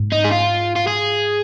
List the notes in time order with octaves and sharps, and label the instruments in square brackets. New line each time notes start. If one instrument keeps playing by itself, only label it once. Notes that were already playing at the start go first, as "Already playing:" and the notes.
Already playing: [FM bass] G#2
[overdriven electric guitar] D#4
G#4
F4
F4
G#4